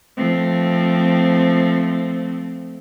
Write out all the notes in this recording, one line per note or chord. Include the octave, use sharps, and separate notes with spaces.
F3 A3 C4